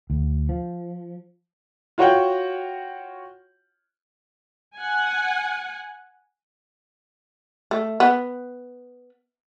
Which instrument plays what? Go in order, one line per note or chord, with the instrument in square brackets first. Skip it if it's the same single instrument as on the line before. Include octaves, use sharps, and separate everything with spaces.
[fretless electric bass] D2
F3
[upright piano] F4 F#4 C#5 F#5 G5
[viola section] F#5 G#5
[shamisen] A3
B3